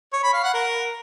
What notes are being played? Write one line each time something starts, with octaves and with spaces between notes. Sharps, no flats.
C#5
B5
F5
F#5
A#4